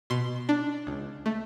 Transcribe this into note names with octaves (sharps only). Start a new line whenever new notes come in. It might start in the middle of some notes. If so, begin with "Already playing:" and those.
B2 C6
D4
C#2
A3